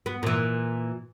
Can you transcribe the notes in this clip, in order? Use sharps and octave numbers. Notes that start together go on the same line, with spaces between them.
B3
A#2 E3